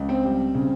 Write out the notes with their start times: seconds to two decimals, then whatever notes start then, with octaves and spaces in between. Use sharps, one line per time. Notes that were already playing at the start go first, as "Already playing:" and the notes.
Already playing: C#2
0.09 C4 C5
0.24 G3
0.55 C#3